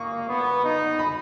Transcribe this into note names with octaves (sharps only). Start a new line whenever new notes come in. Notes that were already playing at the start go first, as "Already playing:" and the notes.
Already playing: A#3 C#6 D#6
B3
D#4
B5